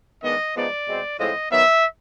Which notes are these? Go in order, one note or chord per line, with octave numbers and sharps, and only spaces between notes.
D#3 G#3 B3 D4 D#5
F3 G#3 B3 D#4 D5
B2 G#3 C4
A2 F3 G#3 C4 D#5
D#3 F#3 B3 E5